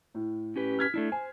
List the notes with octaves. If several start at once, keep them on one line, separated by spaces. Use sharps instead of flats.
A2
C#4 G4 B4
F6 G#6 B6
A3 D4 E4
C5 G#5